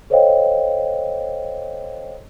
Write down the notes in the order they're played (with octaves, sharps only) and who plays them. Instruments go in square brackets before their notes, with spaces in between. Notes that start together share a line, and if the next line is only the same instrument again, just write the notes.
[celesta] A4 C5 C#5 D#5 F5 G5